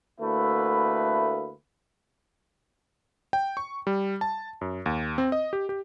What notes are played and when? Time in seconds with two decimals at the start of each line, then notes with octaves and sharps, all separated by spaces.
0.20 D2 A3 A#3 E4 B4
3.33 G5
3.57 C#6
3.87 G3
4.21 A5
4.61 F#2
4.86 D#2
5.18 C4
5.32 D#5
5.53 G4
5.69 G4